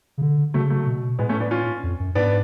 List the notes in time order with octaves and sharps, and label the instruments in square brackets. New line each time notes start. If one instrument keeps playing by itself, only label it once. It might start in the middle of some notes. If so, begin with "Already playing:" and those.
[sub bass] C#3
D3
[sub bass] C#3 [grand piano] F#3 A3
[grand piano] F#3 A3
[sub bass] B2
[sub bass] A2 [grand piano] G#3 B3
[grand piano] A3 C#4
B3 D4
C#4 F4
[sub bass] F2
F#2
[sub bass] G#2 [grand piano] B3 D4